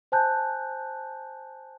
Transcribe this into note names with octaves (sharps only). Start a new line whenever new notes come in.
C5 G#5 A5 F#6 G6